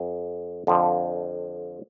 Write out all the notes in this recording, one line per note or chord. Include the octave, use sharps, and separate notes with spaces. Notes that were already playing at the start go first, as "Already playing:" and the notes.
Already playing: F2
F2 D3 F3